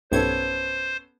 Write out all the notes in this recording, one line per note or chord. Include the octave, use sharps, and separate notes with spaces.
B1 G2 B3 C#4 A4 C5 G#6